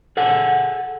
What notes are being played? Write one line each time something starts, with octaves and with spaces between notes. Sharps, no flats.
G#4 A4 F#5